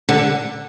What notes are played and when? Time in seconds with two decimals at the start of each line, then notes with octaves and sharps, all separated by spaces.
0.09 D3